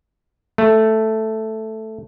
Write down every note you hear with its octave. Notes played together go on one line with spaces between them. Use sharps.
A3